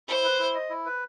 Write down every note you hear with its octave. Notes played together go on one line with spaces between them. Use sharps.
E4 C5
B4
E4
D#5
E4
B4